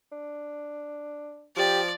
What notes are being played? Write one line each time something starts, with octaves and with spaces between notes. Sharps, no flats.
D4
F3 G4 D5